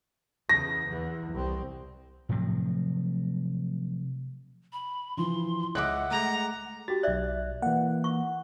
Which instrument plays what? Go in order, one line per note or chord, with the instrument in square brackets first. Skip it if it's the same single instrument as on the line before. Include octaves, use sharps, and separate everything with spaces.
[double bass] E2 C#3 [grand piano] A#6
[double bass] E2 E3
C2 C4
[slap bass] A2 C3 F3 F#3
[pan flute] B5
[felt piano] E3 F3 [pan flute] C6
[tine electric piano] C#2 D#5 E5 [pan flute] F#5 [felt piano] D6 F#6
[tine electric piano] G#3 A3 [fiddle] A#5
[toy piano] F#4 [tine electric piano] G4 A6
[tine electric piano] B1 F#6 [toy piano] D5 E5
[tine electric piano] E3 A#3 [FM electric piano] F#5
[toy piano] C#6